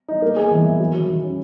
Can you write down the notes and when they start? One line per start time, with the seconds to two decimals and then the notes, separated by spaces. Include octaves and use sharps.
0.08 D#4
0.22 A#3
0.36 G#4
0.51 E3
0.66 E4
0.80 F#3
0.94 D#3
1.09 D#3
1.24 C#4